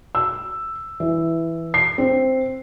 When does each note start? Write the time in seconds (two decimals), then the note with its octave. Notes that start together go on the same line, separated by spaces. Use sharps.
0.15 E6
1.00 E3
1.74 C7
1.98 C4